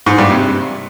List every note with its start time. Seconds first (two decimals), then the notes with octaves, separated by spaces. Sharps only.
0.06 G#2
0.18 G2
0.30 C3